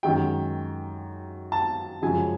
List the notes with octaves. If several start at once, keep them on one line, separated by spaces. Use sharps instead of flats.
F#2 D#3 G#3 G5
A5
F#2 C#3 F3 G#3 G#5